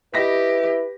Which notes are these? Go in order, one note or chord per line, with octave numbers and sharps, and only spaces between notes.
E4 G4 B4 D#5 A#6 B6